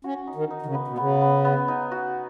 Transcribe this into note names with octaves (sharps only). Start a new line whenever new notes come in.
C#4 F#4
D#4
D#3
D#4
D#3
C#3
B3
B2
C#3 B3
B3
B3
D#4
F#4